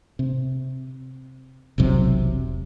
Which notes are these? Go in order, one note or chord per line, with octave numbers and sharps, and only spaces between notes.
C3
E1 B1 C3 F#3